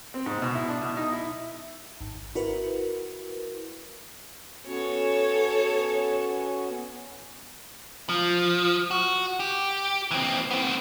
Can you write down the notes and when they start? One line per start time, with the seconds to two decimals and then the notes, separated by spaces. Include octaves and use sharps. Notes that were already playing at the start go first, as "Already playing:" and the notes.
0.14 C4
0.26 G#2
0.42 B2
0.55 E4
0.68 D4
0.81 B2
0.97 D#4
1.12 E4
2.01 G#1
2.35 E4 F#4 A#4 B4
4.66 B3 C#4 F#4 A4 C#5
8.09 F3
8.91 F#4
9.40 G4
10.11 E3 C4
10.51 B3 C4